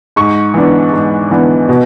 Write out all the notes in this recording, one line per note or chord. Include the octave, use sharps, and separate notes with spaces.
G#2 C#6
E3 B3 D4
G#2
E3 B3 D4
B2